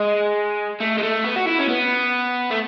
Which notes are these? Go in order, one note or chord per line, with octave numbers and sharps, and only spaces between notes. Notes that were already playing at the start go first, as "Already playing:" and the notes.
Already playing: G#3
A3
G#3
A3
B3
F#4
E4
C#4
B3
A3